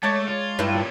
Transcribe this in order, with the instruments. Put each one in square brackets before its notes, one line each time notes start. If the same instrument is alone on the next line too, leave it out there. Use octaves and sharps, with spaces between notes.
[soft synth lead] G#3 [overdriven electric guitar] A3 [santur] C#5 D5 A5
[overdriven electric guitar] F4
[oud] G2 E4
[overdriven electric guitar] A#2 G3 [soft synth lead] F4